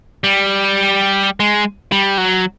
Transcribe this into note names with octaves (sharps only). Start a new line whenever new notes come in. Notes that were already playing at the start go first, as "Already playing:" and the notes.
G3
G#3
G3
F#3